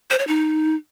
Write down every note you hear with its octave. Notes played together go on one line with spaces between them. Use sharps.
C5
C#5
D#4